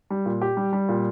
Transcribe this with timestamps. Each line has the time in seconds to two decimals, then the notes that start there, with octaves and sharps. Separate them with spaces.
0.10 G3
0.26 A#2
0.42 G4
0.57 G3
0.73 G3
0.89 A#2